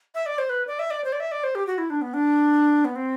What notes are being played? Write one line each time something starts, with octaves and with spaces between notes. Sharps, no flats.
E5
D5
C5
B4
D5
E5
D5
C5
D5
E5
D5
C5
G4
F#4
E4
D4
B3
D4
B3
C4